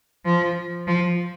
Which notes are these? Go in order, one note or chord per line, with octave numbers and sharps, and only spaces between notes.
F3
F3